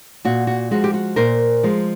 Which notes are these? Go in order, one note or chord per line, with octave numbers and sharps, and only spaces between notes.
A#2 F#4
F#4
F3 G#3 F#4
G4
F#4
A#2 A#4 C5
F3 G#3